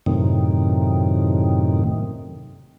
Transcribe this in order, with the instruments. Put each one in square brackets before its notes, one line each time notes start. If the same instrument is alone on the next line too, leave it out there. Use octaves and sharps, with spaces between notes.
[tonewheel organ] F#2 A2 C3 D#3